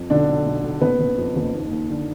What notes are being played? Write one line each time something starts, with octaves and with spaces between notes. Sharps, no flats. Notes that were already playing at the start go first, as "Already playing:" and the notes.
Already playing: F2
B1 D3 D4
B1
B1
B1
F#1 B3 B4
F#1
F2
F#1
D#2
D#2
D3